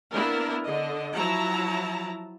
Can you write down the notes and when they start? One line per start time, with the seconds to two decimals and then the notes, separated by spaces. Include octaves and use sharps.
0.13 A#3 B3 D4 E4 A#4
0.64 D3 D#5
1.15 F3 F#3 E4 A5 A#5